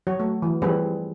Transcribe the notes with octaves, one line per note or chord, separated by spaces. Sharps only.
F#3 F#4 C#5
A3
E3
E3 F3 G3 C4 G#4 B4